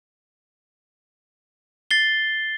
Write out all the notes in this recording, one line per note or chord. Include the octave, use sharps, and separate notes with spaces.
A6 C7 G7